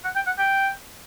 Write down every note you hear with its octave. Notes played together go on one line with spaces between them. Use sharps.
F#5
G5
F#5
G5